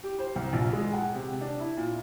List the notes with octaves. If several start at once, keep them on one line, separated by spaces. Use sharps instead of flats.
G4
C5
C2
A#1
G#3
F#5
C3
D4
E4
A#2